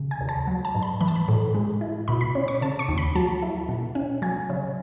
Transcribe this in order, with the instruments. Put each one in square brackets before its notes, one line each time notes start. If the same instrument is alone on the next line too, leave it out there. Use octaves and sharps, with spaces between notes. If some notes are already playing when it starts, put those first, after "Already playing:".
Already playing: [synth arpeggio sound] C#3
G#5
D#2
A5
F#3
A5
G#2
B5
E3 B5
A5
B5
A2
G#3
E4
B2 B5
B5
C#4
C#6
C#3 A5
C#6
D#2
B5
F#3 A5
E4
B2
C#4
F#3 G#5
C#3